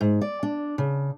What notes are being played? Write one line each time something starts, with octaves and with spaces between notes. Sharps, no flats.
G#2
D5
D4
C#3